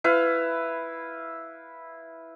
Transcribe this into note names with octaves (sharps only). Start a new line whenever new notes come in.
E4 B4 F5